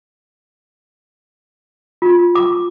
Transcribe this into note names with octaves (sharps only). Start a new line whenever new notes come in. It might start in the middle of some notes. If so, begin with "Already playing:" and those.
F4
D6